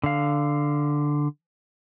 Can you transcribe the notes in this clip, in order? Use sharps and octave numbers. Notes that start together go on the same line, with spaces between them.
D3 F5